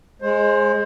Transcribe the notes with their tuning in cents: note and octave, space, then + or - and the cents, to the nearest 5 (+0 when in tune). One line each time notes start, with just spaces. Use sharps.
G#3 +0 C5 +25